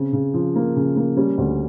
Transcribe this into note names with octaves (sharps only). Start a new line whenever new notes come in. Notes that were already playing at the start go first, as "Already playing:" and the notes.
Already playing: C#3 C4
C#3
F3
A#3
C#3
A#3
G3 C#4
D2